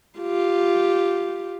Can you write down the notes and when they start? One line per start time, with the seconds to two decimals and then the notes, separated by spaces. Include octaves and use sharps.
0.18 F4 G4